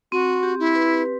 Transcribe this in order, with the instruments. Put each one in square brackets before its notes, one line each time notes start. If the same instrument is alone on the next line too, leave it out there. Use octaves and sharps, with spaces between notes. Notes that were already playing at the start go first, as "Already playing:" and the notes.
[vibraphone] C4 [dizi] F#4
[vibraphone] G4
[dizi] E4
[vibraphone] B4